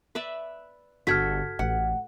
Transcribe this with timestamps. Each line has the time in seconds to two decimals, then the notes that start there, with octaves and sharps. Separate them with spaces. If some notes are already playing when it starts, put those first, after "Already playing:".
0.15 B4 D5 E5
1.07 G1 F#4 A4 G5 F6 G#6 B6
1.59 A1 F#5